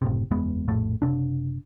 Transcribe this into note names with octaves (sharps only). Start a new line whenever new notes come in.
F#1 A2 C3
F#1 E2 G#3 B3
A#1 F2 A2 A3
F#1 C3 D4